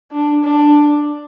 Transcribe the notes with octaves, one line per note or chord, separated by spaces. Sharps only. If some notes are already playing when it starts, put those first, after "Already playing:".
D4
D4